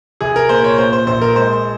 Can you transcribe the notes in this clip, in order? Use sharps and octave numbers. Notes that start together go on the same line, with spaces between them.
C2 G#4
A#4
A#2 C5
C#5
A#2 C5
C5
A#1 C5
A#4
G#3 C5